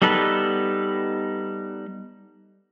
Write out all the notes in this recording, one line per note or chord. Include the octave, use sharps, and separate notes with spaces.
G3 B3 D#4 A4 B4